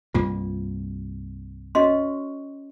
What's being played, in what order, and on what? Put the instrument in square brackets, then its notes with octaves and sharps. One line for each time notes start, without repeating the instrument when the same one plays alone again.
[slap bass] C2 G2 A#3 [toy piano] F4
[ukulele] C#4 [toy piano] F#4 D#5 C6